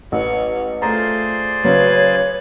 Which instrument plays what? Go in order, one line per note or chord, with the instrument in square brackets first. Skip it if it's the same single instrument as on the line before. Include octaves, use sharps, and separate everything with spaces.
[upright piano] A1 [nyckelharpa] B4 C#5
[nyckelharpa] A3 F4 [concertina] G#4 C5 D5 [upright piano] A#5
[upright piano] C#3 F#3 [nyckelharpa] B4 [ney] C#5